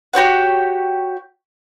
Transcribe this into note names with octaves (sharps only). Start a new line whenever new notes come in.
F#4 G4 C#5 F#5